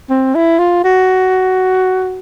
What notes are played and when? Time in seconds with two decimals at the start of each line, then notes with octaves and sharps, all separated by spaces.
0.10 C4
0.35 E4
0.59 F4
0.84 F#4